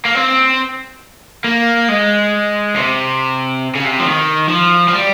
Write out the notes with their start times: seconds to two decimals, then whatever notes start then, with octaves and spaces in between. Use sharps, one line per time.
0.05 A#3
0.15 C4
1.44 A#3
1.88 G#3
2.76 C3
3.75 C#3
3.84 C3
4.00 F3
4.06 D#3
4.49 F3
4.88 F3
4.93 G3